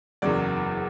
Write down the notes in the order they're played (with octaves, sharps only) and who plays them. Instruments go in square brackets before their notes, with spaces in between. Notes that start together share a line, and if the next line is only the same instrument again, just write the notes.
[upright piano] F#1 E2 C#3 F#3 D5